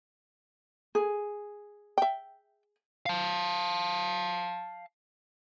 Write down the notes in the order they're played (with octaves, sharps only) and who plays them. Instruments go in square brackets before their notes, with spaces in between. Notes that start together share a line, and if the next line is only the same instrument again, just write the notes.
[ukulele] G#4
[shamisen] E5 G5
[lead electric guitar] F5 A5